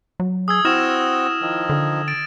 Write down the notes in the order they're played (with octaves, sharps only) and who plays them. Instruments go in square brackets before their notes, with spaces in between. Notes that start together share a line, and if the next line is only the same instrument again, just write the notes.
[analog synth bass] F#3
[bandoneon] G#4 [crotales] D#6 E6 G#6
[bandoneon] C4 F#4 [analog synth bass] E4 [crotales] F6 A#6 E7
[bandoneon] D#3 F3
[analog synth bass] D3
[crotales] A6 D7